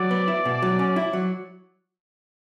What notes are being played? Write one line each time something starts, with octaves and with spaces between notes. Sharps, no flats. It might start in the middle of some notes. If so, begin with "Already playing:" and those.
Already playing: F#3 D5
B3
E4
B2
F#3
C#4
E4
F#3